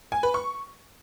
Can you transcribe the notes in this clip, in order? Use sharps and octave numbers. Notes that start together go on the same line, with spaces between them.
G#5
B4
C#6